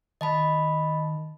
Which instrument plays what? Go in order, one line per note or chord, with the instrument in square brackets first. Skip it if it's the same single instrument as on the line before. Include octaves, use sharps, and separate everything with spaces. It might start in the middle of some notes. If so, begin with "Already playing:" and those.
[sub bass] D#3 [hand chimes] D#5 A5 B5